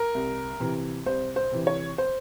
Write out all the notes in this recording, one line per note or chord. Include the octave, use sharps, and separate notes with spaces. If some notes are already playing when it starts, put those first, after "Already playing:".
Already playing: A#4
C2
C3 E3
C2 C5
C5
C3 E3
C#5
C5